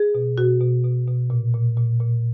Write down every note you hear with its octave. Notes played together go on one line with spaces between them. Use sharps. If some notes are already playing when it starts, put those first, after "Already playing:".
Already playing: G#4
B2
B2 F#4
B2
B2
B2
A#2
A#2
A#2
A#2